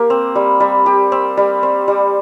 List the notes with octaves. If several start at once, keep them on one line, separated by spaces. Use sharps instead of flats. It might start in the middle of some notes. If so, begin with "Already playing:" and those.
Already playing: A#3 G4
C4
G3
G3
G4
C4
G3
C4
G3